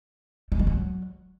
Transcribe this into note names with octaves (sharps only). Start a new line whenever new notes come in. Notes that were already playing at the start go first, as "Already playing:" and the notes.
A3
G#3
F#3